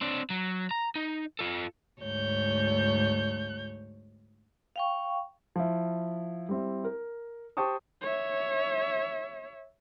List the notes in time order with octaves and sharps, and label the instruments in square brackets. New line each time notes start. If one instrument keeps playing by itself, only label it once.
[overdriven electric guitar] C4 D4
F#3
A#5
D#4
F4 A4
[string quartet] D2 G#2 C#5 G6
[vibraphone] F5 G5 C#6
[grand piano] F3 E4
G3 C4 E4
A#4
G4 C5 G5 A5 C#6 D#6
[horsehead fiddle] C#5 E5